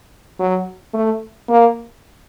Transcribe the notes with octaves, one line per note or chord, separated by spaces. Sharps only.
F#3
A3
A#3